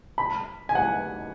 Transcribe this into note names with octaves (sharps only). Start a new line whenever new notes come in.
B5
G#5
F#5